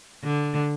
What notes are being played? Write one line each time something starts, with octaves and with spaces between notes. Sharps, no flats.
D3